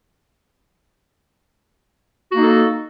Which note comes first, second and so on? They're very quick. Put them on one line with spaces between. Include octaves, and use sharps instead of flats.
F#4 A#3 D#4 A4